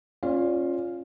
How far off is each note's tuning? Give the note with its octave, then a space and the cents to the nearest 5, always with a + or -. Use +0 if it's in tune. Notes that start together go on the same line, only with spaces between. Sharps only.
C#4 -25 F4 +0 D5 +0